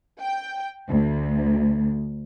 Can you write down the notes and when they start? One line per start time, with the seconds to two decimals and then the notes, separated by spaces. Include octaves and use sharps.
0.21 G5
0.88 D2